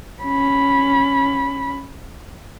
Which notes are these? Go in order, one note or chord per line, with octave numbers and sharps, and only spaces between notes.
C#4 B5